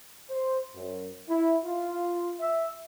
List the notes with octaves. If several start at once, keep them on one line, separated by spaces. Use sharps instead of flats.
C5
F#2
E4
F4
E5